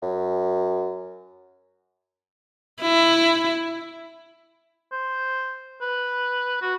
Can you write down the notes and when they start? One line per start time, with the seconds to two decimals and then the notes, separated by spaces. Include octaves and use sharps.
0.02 F#2
2.82 E4
4.92 C5
5.81 B4
6.62 F#4